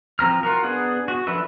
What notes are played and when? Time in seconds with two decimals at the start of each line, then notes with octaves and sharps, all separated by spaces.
0.19 F3 C4 A#5 F6
0.43 F4 F#4 A#4
0.64 B3 D4 G#4 F#5
1.08 F#4
1.27 F3 D4 A4 B4 E5